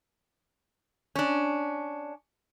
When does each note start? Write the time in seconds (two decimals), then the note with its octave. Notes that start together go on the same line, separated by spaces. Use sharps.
1.16 C#4 D4